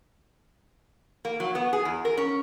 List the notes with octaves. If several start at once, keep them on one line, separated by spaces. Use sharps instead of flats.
A#3
F#3
B3
G#4
E2
A#4
C#4